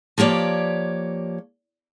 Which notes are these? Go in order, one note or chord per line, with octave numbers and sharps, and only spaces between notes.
F3 A#3 G4 C#5 D5